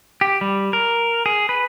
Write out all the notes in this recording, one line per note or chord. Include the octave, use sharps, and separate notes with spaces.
G4
G3
A#4
G#4
B4